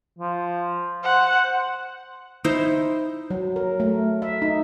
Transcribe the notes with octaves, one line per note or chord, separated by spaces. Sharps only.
F3
C5 F#5
D#4 E4 C5
F#3
A#4
A3
E5
D#4